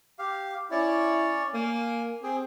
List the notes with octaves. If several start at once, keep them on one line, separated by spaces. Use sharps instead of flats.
G4 F5
C#4 E4 C#5 D5
A#3 G#5
C4 G#4